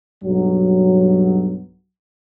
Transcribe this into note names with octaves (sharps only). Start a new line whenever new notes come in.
B1 G2 F#3